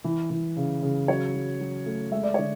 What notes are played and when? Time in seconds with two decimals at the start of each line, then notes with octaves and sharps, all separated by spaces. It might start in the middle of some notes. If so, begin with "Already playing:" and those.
0.04 E3
0.30 E3
0.57 C#3
0.83 C#3
1.08 F#3 C#5
1.34 F#3
1.60 F#3
1.86 A3
2.12 G#3 E5
2.23 D5
2.34 D3 C#5